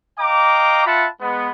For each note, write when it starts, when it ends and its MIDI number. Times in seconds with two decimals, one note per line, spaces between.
0.19 0.85 75
0.19 0.85 77
0.19 0.85 79
0.19 0.85 82
0.19 0.85 86
0.86 1.07 65
0.86 1.07 76
0.86 1.07 78
0.86 1.07 81
0.86 1.07 83
1.20 1.50 56
1.20 1.50 59